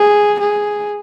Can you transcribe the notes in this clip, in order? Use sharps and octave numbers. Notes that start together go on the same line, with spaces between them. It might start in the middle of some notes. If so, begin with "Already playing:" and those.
Already playing: G#4
G#4